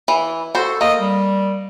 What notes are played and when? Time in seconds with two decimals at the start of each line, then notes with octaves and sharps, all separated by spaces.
0.08 E3
0.55 F#4 A4 C5
0.81 A#3 D#5
0.99 G3